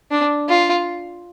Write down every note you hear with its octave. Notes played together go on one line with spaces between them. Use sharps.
D4
F4